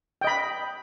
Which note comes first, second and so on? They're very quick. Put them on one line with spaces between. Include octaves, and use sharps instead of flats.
G5 D#5 B5